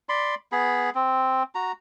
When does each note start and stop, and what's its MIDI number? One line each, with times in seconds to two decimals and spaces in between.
0.09 0.35 74
0.09 0.35 83
0.09 0.35 84
0.52 0.90 59
0.52 0.90 68
0.52 0.90 83
0.95 1.43 60
1.55 1.72 66
1.55 1.72 82